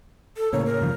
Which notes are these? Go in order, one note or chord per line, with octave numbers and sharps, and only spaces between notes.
A4
A2 C#3 A#3 C#5
A#4
G2 C#3 F3